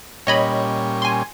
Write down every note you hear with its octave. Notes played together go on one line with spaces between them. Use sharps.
A#2 G3 C#4 C#5 D#5 B5
G#5 C6